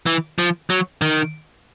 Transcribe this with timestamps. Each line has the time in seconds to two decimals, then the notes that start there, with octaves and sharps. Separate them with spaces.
0.06 E3
0.39 F3
0.70 F#3
1.02 D#3